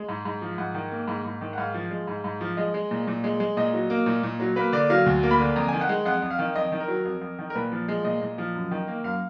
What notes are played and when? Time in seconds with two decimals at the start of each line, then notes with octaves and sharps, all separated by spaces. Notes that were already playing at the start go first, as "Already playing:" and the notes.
Already playing: G#3
0.09 G#2
0.25 G#2
0.42 F3
0.58 G#2 F#5
0.74 D#3
0.92 A#3
1.08 G#2
1.25 G#2
1.41 D#3
1.53 F#5
1.58 G#2 F5
1.74 F3
1.91 G#3
2.07 G#2
2.24 G#2
2.41 F3
2.57 G#3 D#5
2.74 G#3
2.91 A#2
3.07 A#2
3.24 G#3
3.40 G#3
3.57 A#2 D#5
3.74 F#3
3.90 A#3
4.06 A#2
4.23 A#2
4.40 F#3
4.56 A#3 B4
4.72 D3 D5
4.90 F#3 F5
5.06 D2
5.23 A#3
5.31 B5
5.39 D3
5.56 F2 A#5
5.68 D#3 G#5
5.81 F#5
5.89 G#3
6.05 F2 F#5
6.22 F2
6.30 F5
6.39 D#3
6.56 F2 D#5
6.72 D#3
6.80 A#4
6.88 F#3
7.05 F2
7.21 F2
7.39 D#3
7.50 A#4
7.55 A#2 B4
7.72 F3
7.88 G#3
8.04 A#2 D#5
8.22 A#2
8.38 F3
8.55 F#2
8.71 D#3
8.88 A#3
9.04 F#2 F5